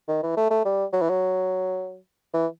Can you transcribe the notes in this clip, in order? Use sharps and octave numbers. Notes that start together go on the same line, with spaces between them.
D#3
E3
A3
A3
G3
F#3
E3
F#3
E3